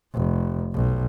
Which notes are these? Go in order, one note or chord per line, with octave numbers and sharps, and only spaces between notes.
F1
B1